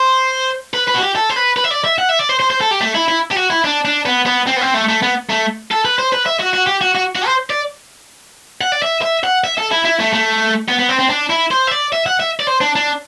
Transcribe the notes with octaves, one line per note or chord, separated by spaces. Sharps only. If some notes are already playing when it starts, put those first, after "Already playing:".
Already playing: C5
B4
B4
F#4
G4
A4
C5
B4
B4
E5
D5
E5
F#5
E5
D5
C5
C5
C5
A4
G4
A3
E4
E4
G4
F#4
E4
D4
D4
B3
B3
C4
B3
C4
A3
A3
B3
A3
A4
B4
C5
B4
E5
F#4
F#4
G4
F#4
F#4
F#4
C5
D5
F#5
D5
E5
E5
F#5
E5
A4
E4
E4
A3
A3
B3
B3
C4
C4
D4
E4
C5
E5
D5
E5
F#5
E5
D5
C5
D4
D4